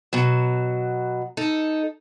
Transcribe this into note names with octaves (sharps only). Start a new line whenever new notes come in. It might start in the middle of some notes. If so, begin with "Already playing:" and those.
B2 F#3
D#4 A4